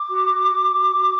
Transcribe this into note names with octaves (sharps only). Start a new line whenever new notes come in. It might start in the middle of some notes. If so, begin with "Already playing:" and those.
Already playing: D6
F#4
F#4
F#4
F#4
F#4